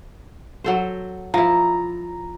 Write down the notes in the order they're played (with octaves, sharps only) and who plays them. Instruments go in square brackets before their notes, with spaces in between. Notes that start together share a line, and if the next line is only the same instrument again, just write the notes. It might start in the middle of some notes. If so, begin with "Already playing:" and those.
[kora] F#3 A4 C5
[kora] F3 E4 [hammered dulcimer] A#5